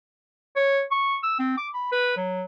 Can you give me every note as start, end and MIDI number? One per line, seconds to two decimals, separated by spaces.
0.56 0.82 73
0.92 1.17 85
1.23 1.35 88
1.39 1.55 60
1.58 1.68 86
1.74 1.88 83
1.92 2.16 71
2.17 2.44 54